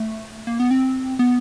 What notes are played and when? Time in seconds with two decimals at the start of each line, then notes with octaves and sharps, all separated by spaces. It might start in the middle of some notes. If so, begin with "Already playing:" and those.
Already playing: A3
0.47 A#3
0.60 B3
0.71 C4
1.19 B3